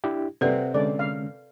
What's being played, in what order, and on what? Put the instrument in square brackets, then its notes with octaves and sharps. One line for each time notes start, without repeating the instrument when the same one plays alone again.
[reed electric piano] D4 E4 G4
[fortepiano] C3 C4 [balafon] A4 B4 D5 [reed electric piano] C5 F#5
[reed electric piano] D3 G#3 C#4 [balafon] A4 [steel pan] D5
[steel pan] F5